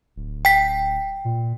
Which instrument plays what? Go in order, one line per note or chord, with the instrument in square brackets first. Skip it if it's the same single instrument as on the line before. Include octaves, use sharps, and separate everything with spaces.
[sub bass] D1
[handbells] G5 B6
[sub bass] A#2